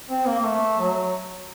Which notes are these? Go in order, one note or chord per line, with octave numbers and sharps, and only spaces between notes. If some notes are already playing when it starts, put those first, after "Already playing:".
C4
A#3
A#3
A3
F#3